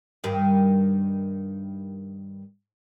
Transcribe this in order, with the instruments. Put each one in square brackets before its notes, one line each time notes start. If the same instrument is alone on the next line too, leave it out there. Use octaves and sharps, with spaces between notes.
[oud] G2 D#3